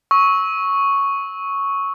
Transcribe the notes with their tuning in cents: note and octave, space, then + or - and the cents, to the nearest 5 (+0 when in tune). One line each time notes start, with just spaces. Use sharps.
C#6 +0 E6 -30